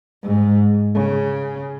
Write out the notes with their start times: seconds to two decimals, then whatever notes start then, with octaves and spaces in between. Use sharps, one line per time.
0.23 G#2
0.95 C#3